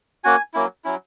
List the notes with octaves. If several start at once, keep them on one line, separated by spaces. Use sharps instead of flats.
A#3 C#4 F#4 G#5
F#3 A#3 C#4 E4
F#3 C#4 E4